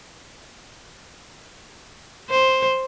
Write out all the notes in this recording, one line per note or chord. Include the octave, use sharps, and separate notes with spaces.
C5